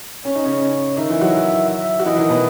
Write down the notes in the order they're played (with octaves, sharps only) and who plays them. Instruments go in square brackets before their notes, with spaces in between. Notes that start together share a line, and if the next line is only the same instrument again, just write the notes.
[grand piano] C#4 [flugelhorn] C#5
[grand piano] D#4
C#3 C#4
[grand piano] D#3 D#4 [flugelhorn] E5
[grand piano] E3 E4
F#3 F#4
[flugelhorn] E5
[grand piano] F#4
[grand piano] E3 E4 [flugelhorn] D#5
[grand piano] D#3 D#4
B2 B3